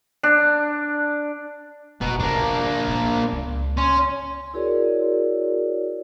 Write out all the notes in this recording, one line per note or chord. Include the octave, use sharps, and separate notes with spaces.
D4
F#1 B2 A#5
C#3 A#3 D4
A#1
C#2
C#4 C6
E4 F#4 G#4 A#4 C#5 D5